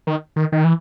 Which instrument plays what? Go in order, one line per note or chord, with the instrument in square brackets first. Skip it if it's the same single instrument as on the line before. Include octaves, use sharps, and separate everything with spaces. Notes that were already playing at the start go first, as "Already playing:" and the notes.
[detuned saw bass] D#3
D#3
D#3
E3